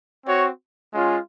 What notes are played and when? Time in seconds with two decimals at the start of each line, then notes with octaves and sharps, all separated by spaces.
0.25 C4 F#4 C#5
0.93 G#3 C#4 F4